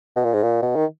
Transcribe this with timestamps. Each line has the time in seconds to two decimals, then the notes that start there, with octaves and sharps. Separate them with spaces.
0.16 B2
0.24 A#2
0.34 G#2
0.43 A#2
0.62 B2
0.76 D#3